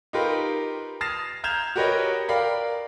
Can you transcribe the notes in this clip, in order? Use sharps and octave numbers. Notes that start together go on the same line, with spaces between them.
D#4 F4 G4 A#4 B4
D#6 F6 A6 A#6 C7 E7
A#5 F6 G6 G#6 E7 F7
F#4 G4 A#4 B4 C#5 D#5
A#4 D5 F5 G5 B5